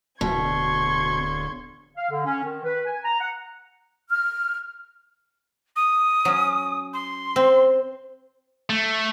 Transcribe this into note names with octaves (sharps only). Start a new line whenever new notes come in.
D1 B2 C6 C#6 G#6
F5
D3
C#4
D#3
B4
G#5
A#5
F#5
F6
D#6
F#3 C#4
C6
C4
A3